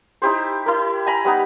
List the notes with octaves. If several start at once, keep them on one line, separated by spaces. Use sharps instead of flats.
D#4 E4 G4 C5
E4 A#4
G#5 A#5 B5
G3 B3 D#4